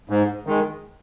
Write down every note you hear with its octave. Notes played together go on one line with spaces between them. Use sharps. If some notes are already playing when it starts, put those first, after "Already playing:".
G#2
D#3 G#3